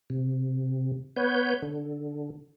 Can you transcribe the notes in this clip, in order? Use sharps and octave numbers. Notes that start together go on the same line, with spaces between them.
C3
B3 B4 C#5 G6
D3